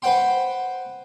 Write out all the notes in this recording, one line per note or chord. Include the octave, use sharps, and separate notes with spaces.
B4 C5 F#5 G5 C6